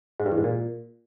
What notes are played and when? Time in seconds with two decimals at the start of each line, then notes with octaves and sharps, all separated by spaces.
0.20 G#2
0.26 G2
0.32 E2
0.38 G#2
0.44 A#2